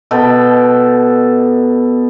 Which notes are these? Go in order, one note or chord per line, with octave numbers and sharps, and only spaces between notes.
B2 A4 G5